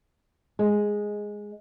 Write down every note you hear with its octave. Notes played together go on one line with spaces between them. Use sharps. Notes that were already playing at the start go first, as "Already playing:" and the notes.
G#3